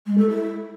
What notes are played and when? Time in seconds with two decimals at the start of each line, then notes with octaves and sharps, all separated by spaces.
0.06 G#3
0.18 A4
0.30 E4